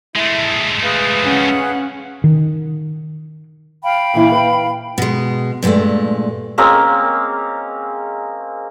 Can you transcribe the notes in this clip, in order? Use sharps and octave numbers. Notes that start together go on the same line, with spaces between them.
G#3 A3 E4
G#4 B4 F5
C#4 F#5
D#3
F5 G5 B5
A#2 E3 E4
B4
B2 G#3
G2 A#2 E3 G#3 A3
G#3 A#3 C4 C#4